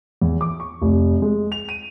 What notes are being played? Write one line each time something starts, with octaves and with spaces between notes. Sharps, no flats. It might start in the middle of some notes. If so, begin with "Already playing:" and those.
E2
D6
C#6
F1
G#3
F7
D#7